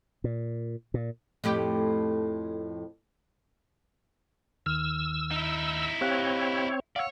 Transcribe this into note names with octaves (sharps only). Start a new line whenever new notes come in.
A#2
A#2
F2 A2 G4
D#2 D#3 E6 F6
D#4 E4
C4 G4 C#5 F5 F#6
C#5 D5 F5 F#5 E6